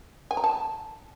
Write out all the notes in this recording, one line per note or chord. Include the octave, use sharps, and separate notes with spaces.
G#5
A#5
A5